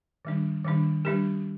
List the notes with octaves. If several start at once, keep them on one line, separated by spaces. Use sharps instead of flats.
D#3 G3 D4
D#3 G3 D4
G3 D4 G4 A#4